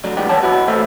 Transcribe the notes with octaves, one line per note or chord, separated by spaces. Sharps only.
A2 D3 F#3 D4
C2 E3 G#3 B3 D4 G4
G2 D#3 B3 C#5 A5
B3 E4 F#4
E3 A3 A4 C5 E5